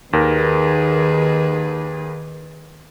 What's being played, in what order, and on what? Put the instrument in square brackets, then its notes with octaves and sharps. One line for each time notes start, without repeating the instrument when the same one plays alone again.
[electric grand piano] D#2 A#4 [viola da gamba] D#3 G#4 B4